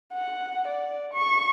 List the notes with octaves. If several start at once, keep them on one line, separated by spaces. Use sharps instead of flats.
F#5
D5
C#6